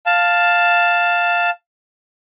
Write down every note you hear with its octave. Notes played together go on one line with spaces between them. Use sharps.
F5 A5